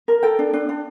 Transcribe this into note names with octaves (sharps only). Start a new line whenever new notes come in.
A#4
A4 G5
D4
D4
D4